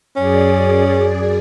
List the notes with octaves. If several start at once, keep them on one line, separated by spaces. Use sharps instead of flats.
F#2 C#4 G#4 D5